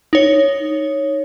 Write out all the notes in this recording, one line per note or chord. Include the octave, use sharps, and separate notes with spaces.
D#4 C#5